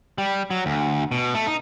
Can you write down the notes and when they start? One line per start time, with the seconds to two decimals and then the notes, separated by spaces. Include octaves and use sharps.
0.18 G3
0.51 F#3
0.66 D2
1.12 B2
1.34 A3
1.47 D#4